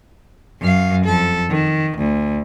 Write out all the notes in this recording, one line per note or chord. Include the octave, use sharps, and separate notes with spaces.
F#2 F5
F2 A4
D#3
D2